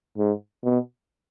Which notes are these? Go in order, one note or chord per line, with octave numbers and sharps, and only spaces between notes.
G#2
B2